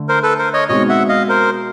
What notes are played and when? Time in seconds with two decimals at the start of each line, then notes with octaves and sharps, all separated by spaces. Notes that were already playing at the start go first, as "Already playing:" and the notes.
Already playing: D3 A3
0.09 A#4 C5
0.23 A4 B4
0.38 A#4 C5
0.53 C#5 D#5
0.69 B2 G#3 C4 D#4 C#5 D#5
0.89 E5 F#5
1.08 D#5 F5
1.29 A#4 C5